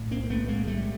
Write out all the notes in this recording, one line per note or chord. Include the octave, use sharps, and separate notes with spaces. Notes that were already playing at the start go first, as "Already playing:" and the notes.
Already playing: B1 A2
A#3 C4
A3 B3
G#3 A#3
G3 A3